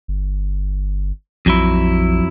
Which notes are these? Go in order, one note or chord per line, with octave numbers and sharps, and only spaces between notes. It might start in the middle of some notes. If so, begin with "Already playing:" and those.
G1
A#1 F2 F#3 E4